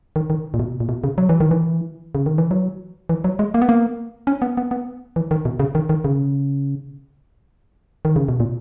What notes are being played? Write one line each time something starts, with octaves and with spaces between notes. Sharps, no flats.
D#3
D#3
A#2
B2
A#2
B2
C#3
F#3
E3
D#3
E3
C#3
D#3
E3
F#3
E3
F#3
G#3
A#3
B3
A#3
C#4
B3
B3
B3
E3
D#3
B2
C#3
D#3
D#3
C#3
D#3
C#3
B2
A#2